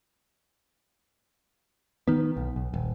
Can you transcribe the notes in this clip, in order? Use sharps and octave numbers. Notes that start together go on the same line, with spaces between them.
D#3 B3
B1
B1
D#1